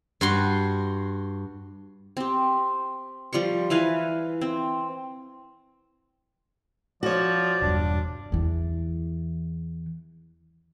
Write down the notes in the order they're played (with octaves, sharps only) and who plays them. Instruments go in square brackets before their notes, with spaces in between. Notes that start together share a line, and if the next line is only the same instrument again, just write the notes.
[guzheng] G2 F#4 C6
[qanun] C4 G4
F3 G3 C6 C#6
E3 B4 F5 G#5
C4
[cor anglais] F3 [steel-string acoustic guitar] F#4 C#5 [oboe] D5
[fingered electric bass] E1 G2 [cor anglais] D4
[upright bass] E2 E3